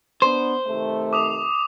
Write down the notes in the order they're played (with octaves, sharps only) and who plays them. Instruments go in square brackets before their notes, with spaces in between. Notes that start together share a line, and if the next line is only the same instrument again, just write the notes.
[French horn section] B3 D4 [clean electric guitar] C5
[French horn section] C3 D#3 A3
[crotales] D6 D#6 F7